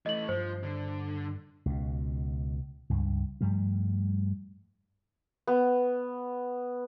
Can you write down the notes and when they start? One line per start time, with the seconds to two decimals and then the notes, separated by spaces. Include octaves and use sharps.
0.06 E3 A3 D#5 F#7
0.29 G2 F3 C5
0.63 D3
1.66 C#2 B2
2.90 C#2 G2
3.41 G2 F3 G3 A3
5.47 B3